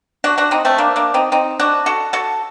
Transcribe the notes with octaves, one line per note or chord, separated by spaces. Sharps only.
D4 F#4
D4 F#4
C4 D#4
A3 C4
A#3 D4
A#3 D4
C4 D#4
C4 D#4
D4 F#4
F#4 A4
F#4 A4